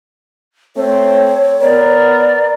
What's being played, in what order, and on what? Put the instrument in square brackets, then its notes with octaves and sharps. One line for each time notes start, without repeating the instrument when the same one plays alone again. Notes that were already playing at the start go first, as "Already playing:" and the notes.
[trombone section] A3 C4 [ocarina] C#5
[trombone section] B3 A#4 [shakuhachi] D5